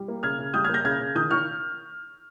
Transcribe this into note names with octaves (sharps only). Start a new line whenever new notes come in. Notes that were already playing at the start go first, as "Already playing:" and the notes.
Already playing: G3
A#3
C#3 F6 G#6
C#3
G3 D#6 G6
F6 G#6
A#3 G6 A#6
C#3 F6 G#6
C#3
D#3 D#6 G6
D#3 C#6 F6